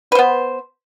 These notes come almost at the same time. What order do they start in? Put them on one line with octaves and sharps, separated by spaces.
B4 C5 B3